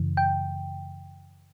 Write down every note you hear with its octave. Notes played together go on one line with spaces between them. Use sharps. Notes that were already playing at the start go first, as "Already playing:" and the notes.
Already playing: F#2 C#3 E3
G5